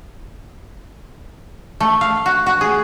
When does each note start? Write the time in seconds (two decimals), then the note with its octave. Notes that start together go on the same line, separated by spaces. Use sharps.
1.80 A3
2.01 F5
2.26 F#4
2.46 F#4
2.61 G#4